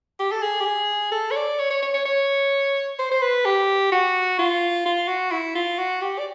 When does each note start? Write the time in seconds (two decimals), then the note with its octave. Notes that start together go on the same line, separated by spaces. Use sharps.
0.20 G4
0.32 A4
0.43 G#4
0.60 G4
0.65 G#4
1.12 A4
1.31 C#5
1.36 D5
1.59 C#5
1.71 C#5
1.82 C#5
1.94 C#5
2.05 C#5
2.99 C5
3.11 C5
3.22 B4
3.45 G4
3.92 F#4
4.39 F4
4.86 F4
5.08 F#4
5.32 E4
5.55 F4
5.78 F#4
6.02 G4
6.19 D5